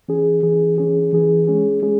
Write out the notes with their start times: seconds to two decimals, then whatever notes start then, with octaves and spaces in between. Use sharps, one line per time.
0.08 E3 C#4 G#4
0.43 E3 C#4 G#4
0.78 E3 C#4 G#4
1.13 E3 C#4 G#4
1.47 G#3 C#4 G#4
1.82 G#3 C#4 G#4